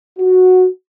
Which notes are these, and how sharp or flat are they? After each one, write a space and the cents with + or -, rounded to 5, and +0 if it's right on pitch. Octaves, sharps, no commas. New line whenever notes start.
F#4 -5